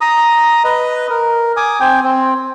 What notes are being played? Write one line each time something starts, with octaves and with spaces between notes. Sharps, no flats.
A#5 D#6
B4 D#5
A#4
G#5 D6 D#6
C4 G5 G#5
C4